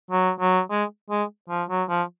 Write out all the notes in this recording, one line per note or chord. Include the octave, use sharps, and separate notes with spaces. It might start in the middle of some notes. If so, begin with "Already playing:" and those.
F#3
F#3
G#3
G#3
F3
F#3
F3